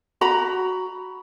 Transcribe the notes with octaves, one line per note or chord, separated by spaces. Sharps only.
F#4 A#5 B5